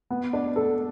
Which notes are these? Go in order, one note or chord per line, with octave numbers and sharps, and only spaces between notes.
B3
D4
A4